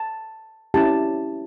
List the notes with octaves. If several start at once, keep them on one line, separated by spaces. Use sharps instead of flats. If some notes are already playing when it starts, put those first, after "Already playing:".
Already playing: A5
C#4 E4 G4 A5